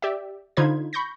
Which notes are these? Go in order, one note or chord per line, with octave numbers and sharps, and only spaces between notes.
G4 D5 E5
D3 D#4 F4 C5 B5 G#6
B5 C#6 G6 A#6